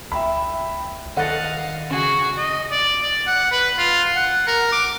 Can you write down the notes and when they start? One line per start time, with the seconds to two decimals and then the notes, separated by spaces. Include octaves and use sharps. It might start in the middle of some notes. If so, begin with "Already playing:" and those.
0.12 C#2 E5 G5 B5
1.17 D#3 A4 D5 D#5 F5 F#5 A6
1.90 C#3 F#4 G#4
2.37 D#5
2.72 D5
3.02 D5
3.27 F#5
3.52 B4
3.78 F4
4.16 F#5
4.47 A#4
4.72 D6